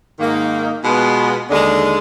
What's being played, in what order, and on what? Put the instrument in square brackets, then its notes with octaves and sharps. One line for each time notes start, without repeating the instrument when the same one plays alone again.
[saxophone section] G#2 D#3 A#3 D#4
B2 G#3 B3 F4
D#2 D3 G#3